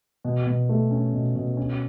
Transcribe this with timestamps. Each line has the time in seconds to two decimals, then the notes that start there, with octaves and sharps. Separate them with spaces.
0.25 B2
0.47 B2
0.69 A3
0.91 C#4
1.13 B2
1.36 B2
1.57 C#4